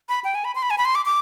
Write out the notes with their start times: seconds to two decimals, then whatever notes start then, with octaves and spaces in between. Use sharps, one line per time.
0.09 B5
0.24 G5
0.35 G#5
0.45 B5
0.55 C6
0.62 B5
0.70 G#5
0.78 B5
0.85 C6
0.95 D6
1.05 D6